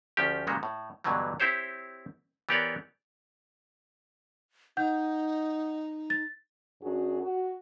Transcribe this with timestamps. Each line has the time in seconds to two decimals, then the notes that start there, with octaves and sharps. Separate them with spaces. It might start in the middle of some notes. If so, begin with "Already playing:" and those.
0.17 D2 F3 C#4 G4
0.47 A#2 C#3 G3 G#3 F#4
0.63 A2
1.04 G2 B2 D3 E3 F#3 G3
1.40 C4 E4 G4 C5 C#5
2.49 E3 B3 G4 A#4 C#5 D5
4.77 D#4 F#5 G6
6.10 A6
6.82 F#2 D4 F#4 G#4
7.21 F#4